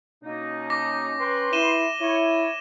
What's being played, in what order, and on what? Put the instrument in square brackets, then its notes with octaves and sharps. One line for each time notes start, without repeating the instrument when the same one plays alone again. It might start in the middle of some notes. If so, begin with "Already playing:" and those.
[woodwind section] B2 A#3 D#4 [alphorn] C#4
[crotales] D6 A#6
[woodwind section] B4 G5 C6
[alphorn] E4 [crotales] D#7 E7 G7
[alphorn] E4 [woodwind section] C#5